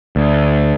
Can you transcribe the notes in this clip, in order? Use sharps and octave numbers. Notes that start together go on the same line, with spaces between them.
D2